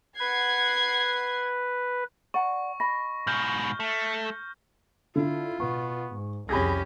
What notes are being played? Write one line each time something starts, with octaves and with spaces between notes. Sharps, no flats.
B4 F#5 G#6 C7
D5 F#5 A#5 C#6
D#5 B5 A#6
G#2 B2 F6 G6
A3
D3 E4 F4
B2 B3 C#6
G#2
C2 F2 C#4 G4 G#4 B5 G#6 A#6